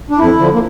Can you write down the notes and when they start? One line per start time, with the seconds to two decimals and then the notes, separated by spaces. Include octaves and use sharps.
0.10 D4
0.19 F2 E4
0.39 D3 F3
0.54 A#3